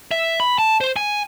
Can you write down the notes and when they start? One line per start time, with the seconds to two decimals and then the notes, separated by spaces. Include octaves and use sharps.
0.11 E5
0.40 B5
0.58 A5
0.81 C5
0.96 G#5